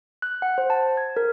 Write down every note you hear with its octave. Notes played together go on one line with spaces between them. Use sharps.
F#6
F#5
C5
A5
G#6
A#4